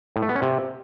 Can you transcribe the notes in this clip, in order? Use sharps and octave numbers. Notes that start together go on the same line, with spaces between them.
A2
A3
B3
C#4
C3